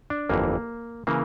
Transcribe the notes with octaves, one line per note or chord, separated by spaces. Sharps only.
D4
G1 F2 E3 A#3
C#3 E3 A#3